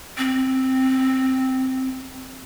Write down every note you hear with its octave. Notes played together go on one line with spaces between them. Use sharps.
C4